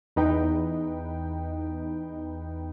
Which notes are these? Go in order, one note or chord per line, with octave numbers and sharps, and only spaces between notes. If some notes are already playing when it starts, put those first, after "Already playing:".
E2 D#4 B4 G5